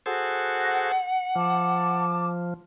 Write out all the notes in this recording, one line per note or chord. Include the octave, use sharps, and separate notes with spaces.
F#4 G#4 A4 C5 F#5
F3 A5 D6